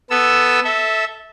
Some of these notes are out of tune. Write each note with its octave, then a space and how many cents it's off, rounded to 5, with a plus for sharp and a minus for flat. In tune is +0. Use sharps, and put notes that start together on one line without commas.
B3 +0 A4 +0 E6 +0
A4 +0 E5 -15